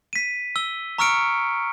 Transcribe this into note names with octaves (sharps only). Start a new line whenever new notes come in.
B6 D#7
E6 G7
A#5 C#6 E6 F6 C#7 D7